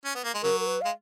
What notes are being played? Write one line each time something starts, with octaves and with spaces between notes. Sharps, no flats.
C#4
B3
A#3
G#3
C#3 F#3 A#4
A#4
B4
G#3 F5